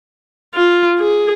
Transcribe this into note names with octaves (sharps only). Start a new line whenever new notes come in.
F4
G#4